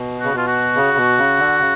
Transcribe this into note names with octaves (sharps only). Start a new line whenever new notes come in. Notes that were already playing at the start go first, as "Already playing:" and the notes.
Already playing: B2
C#3 F#4
B2 F4
F#4
C#3
B2
C#3
D3
C#3